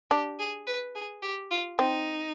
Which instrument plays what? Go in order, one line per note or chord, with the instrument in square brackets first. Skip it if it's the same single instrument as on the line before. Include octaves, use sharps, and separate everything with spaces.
[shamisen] D4 [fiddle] G4
[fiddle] G#4
B4
G#4
G4
F4
[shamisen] C4 [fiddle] D#4